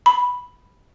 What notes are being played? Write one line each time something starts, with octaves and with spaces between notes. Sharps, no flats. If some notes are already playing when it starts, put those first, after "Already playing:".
B5